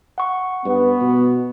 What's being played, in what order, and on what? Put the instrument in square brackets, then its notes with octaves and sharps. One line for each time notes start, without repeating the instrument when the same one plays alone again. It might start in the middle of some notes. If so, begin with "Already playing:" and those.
[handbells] F#5 C#6
[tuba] G2 [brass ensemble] B3
[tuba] B2